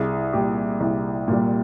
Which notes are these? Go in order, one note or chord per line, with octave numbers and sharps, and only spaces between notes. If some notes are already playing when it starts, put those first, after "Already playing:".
Already playing: C2 G#4
A#2 G3 G4
C2
A#2 G3